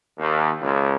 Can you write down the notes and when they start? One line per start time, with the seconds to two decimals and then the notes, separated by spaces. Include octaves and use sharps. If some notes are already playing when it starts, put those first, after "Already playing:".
0.18 D#2
0.62 C#2